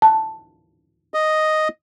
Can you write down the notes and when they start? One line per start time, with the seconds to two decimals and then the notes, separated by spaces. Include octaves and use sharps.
0.02 A5
1.14 D#5